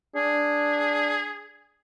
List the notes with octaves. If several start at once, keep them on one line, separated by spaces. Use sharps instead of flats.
D4 G#4